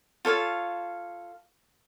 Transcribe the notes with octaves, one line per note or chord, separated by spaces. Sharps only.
F4 A4 C#5 F5